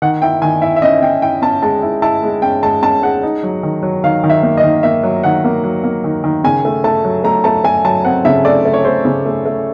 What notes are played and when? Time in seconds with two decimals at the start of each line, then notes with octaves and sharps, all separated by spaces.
0.02 D#3 F#5
0.22 E4 G5
0.42 D#3 G#5
0.62 E4 E5
0.76 E5
0.82 C#4 D#5
1.02 C#4 G5
1.22 E4 G5
1.42 C#4 A5
1.63 G#3 A5
1.82 E4
2.02 E4 A5
2.23 G#3
2.42 C#4 G5
2.63 G#3 A5
2.82 C#4 A5
3.03 G#3 F#5
3.23 D#4
3.43 F#3
3.63 D#3
3.83 F#3
4.04 D#3 F5
4.24 D#3
4.29 E5
4.43 A#3
4.57 D#5
4.64 D#3
4.83 A#3 E5
5.03 F#3
5.23 D#3 F#5
5.44 A#3
5.64 F#3
5.84 A#3
6.04 D#3
6.24 D#3
6.44 C#3 G#5
6.65 A3
6.84 A3 A5
7.05 F#3
7.24 A3 A#5
7.44 A3 A5
7.64 A3 G#5
7.85 F#3 A5
8.05 C4 F#5
8.25 C#3 E5
8.45 A3 D5
8.65 A3
8.74 C#5
8.85 A3 C5
9.05 C#3
9.26 A3
9.46 A3